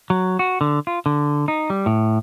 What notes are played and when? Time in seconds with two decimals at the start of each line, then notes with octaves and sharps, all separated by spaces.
0.10 F#3
0.39 F#4
0.61 D3
0.87 F4
1.06 D3
1.48 D#4
1.70 G3
1.86 A2